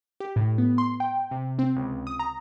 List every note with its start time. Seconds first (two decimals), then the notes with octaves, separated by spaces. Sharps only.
0.20 G4
0.36 A2
0.58 B3
0.78 C6
1.00 G5
1.31 C3
1.59 C4
1.77 C#2
2.07 D#6
2.19 A#5